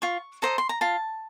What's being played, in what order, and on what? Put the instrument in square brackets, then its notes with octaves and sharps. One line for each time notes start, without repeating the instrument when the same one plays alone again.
[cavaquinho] F4 C#6
A4 C5 D#5 A#5
C6
A#5
F4 A5